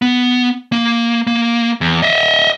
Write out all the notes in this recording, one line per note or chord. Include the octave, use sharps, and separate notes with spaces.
B3
A#3
A#3
E2
D#5 E5